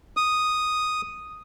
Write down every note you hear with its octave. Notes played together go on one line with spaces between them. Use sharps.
D#6